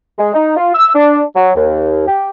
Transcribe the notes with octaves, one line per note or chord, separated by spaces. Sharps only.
G#3
D#4
F4
E6
D4
F#3
D#2
G4